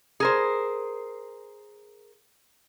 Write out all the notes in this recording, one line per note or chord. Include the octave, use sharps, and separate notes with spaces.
G#4 A#4 C5